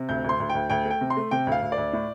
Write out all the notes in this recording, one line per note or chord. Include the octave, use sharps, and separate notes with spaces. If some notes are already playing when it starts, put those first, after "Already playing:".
Already playing: C3
D2 G6
D2
C6
D2
G5
D2
D2 G5
A3
G5
C3
C6
A3
C3 G5
D2
F5
D2
D5
D2
A2